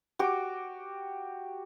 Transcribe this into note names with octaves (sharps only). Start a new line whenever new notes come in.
F#4 G4 D6